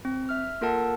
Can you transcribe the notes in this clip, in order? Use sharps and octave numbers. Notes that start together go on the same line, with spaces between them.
C4
E5 F6
A#3 F4 A4 A#4 F#5 A5